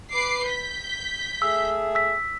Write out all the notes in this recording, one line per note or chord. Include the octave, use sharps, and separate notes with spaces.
B4 D6 C7
G6 B6
A3 G#4 E5 E6
E6 B6